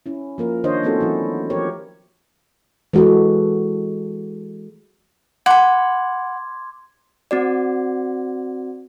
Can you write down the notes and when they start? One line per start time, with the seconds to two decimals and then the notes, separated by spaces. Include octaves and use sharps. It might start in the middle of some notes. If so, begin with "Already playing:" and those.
0.06 C#4 E4
0.38 F3 A#3 A#4
0.64 D#3 D4 C5 C#5 D#5
0.83 A3 B3 C#4 E4 F#4 A4
1.00 E3 F#3 E4
1.50 F3 G4 A#4 C#5
2.93 E3 G#3 F#4 G#4 A4
5.46 F#5 B5 C6 D6 G#6
7.31 C4 F#4 D5